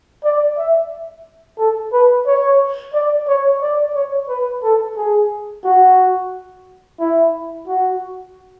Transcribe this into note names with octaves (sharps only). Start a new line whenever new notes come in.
D5
E5
A4
B4
C#5
D5
C#5
D5
C#5
B4
A4
G#4
F#4
E4
F#4